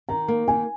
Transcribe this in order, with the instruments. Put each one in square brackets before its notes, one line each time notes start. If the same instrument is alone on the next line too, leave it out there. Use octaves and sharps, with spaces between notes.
[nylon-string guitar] D#3 [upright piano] A#5
[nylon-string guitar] A#3
[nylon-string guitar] D#3 [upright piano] G#5